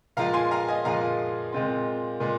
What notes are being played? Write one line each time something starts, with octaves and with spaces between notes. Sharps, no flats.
A#2 F3 G#3 F4 F5 A#5
G#5 C6
F5 A#5
D#5 G#5
A#2 F3 G#3 F4 F5 A#5
A#2 G#3 C4 F4
A#2 G#3